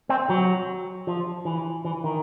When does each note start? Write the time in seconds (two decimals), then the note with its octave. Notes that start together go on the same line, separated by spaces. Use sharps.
0.09 C4
0.30 F#3
1.07 F3
1.45 E3
1.85 E3
2.04 D#3